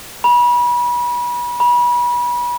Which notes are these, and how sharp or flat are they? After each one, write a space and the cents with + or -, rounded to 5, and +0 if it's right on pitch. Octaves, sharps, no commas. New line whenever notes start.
B5 -30
B5 -30